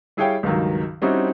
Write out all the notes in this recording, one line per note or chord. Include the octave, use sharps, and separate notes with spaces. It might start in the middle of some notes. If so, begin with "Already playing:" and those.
G3 E4 G#4 C#5 F5 G5
C#2 G2 D#3 F#3
G3 C4 C#4 D#4 E4 F#4